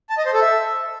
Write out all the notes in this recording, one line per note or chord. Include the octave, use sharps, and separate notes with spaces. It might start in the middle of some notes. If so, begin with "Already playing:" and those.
A5
D#5
C5
A4
E5